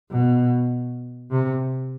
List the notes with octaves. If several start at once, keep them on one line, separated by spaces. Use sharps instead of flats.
B2
C3